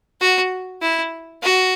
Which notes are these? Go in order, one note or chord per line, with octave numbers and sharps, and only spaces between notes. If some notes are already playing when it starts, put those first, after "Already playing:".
F#4
E4
F#4